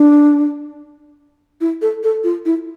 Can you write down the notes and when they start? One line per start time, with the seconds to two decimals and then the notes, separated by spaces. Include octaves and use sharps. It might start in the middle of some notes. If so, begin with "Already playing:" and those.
Already playing: D4
1.61 E4
1.82 A4
2.03 A4
2.24 F4
2.45 E4